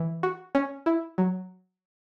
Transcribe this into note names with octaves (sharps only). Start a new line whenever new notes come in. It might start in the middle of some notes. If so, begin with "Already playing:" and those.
Already playing: E3
F#4
C#4
E4
F#3